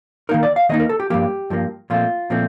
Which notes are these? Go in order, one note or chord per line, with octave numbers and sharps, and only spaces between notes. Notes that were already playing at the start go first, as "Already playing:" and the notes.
D#3 A#3 D#4 A#4
D5
F5
D#3 A#3 D#4 D#5
A#4
A4
G4
G2 F3 A#3 G4
G2 F3 A#3
A#2 F3 A3 C4 F4
A#2 F3 A3 C4